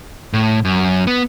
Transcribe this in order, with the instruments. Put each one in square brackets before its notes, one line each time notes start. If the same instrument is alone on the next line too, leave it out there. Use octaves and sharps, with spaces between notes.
[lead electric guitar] A2
F#2
B3